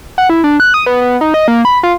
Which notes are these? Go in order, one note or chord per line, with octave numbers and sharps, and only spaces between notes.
F#5
E4
D4
F#6
D#6
B3
B3
D#4
D#5
A#3
B5
F4